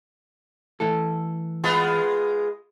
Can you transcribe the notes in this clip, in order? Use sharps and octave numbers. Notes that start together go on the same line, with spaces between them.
E3 A3 A4
G#3 B3 F4